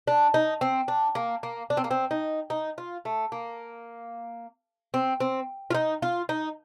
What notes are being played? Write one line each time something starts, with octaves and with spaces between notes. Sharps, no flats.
D4
D#4
C4
D4
A#3
A#3
D4
C4
A#3
C4
D#4
D#4
F4
A3
A#3
C4
C4
F4
D#4
F4
D#4